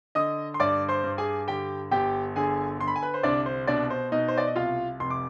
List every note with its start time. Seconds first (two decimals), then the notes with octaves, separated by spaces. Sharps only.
0.15 D3 D#5 D#6
0.54 C6
0.60 G2 D5 D6
0.89 C5 C6
1.04 G2
1.18 G#4 G#5
1.48 D3 G4 G5
1.91 G1 G4 G5
2.36 D3 G#4 G#5
2.79 D3 C6
2.88 B5
2.96 G#5
3.02 B4 B5
3.14 C5
3.23 C2 D4 D5
3.46 C5
3.67 B2 D4 D5
3.90 C5
4.12 B2 D#4 D#5
4.28 C5
4.38 D5
4.47 D#5
4.56 C2 F4 F5
5.00 F1 C6
5.10 D6